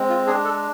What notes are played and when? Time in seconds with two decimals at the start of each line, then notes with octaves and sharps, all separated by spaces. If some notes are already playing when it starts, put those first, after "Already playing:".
Already playing: G#3 C4
0.09 F4
0.27 D4 G#4
0.45 A4